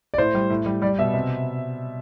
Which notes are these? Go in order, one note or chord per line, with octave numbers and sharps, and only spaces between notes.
D5
A2 C5
G3
A2
G3
G3 D5
B2 E5
C3